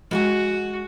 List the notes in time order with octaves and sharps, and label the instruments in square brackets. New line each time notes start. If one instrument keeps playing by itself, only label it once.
[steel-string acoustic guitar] G#3 F#5 G#5 [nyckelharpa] F#4